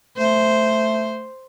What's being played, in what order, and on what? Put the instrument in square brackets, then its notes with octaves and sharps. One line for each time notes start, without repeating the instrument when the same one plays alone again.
[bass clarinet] A3 [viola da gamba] C5